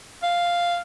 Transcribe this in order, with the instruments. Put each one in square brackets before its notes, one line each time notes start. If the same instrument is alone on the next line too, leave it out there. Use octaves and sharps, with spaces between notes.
[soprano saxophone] F5